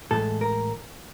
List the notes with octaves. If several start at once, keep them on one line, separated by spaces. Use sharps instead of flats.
A2 E3 G#3 A4
A#4